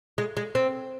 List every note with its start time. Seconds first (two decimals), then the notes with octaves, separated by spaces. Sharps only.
0.18 G#3
0.37 G#3
0.55 C4